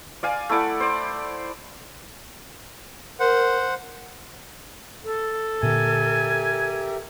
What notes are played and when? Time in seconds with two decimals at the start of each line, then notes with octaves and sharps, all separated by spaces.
0.23 D5 F5 G#5
0.49 A3 E4 D5 F#5
0.80 C5 D5
3.20 A#4 C5 F#5
5.03 A4
5.63 A#2 D3 G4 A#4 E5 G#5